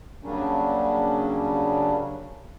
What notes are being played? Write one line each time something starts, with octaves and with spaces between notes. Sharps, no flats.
C#3 F#3 G3 A#3 C#4 D4